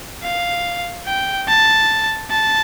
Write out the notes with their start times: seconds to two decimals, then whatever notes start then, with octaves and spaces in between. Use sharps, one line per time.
0.23 F5
1.07 G5
1.48 A5
2.31 A5